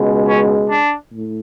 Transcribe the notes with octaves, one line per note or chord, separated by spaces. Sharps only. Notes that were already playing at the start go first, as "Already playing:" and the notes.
Already playing: C#2 B2 G#3
C#4
D4
A2